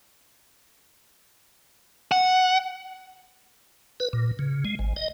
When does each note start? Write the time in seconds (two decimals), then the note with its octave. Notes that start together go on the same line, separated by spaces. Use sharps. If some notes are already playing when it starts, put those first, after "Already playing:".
2.12 F#5
4.00 B4
4.13 A#2
4.39 C#3
4.65 G#3
4.79 G#1
4.96 D#5